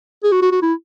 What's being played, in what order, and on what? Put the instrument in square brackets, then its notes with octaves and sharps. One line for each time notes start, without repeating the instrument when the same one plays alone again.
[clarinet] G#4
F#4
F#4
F#4
E4